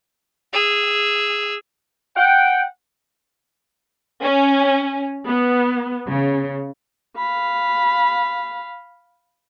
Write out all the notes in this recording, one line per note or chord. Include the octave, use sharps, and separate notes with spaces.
G#4 E6
F#5 G5
C#4
B3
C#3
F5 B5